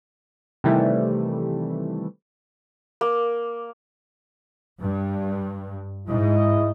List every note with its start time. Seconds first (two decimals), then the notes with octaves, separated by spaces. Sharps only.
0.64 C3 D#3 E3 G3 A3
3.01 A#3
4.81 G2
6.07 G#2 E4 D#5